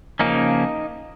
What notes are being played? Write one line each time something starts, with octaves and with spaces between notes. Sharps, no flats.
C#3 F3 A#3 C#4 D#4